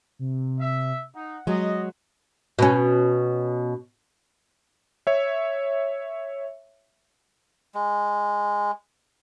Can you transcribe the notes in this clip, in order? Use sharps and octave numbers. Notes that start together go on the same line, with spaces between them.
C3
E5
D#4 F#5
F#3 G#3 D#5
B2 C#4
C#5 E5
G#3